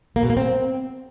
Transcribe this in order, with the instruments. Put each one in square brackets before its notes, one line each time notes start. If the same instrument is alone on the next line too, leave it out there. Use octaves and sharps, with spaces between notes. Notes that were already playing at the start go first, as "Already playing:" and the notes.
[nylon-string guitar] A#3
B2
A#3
C4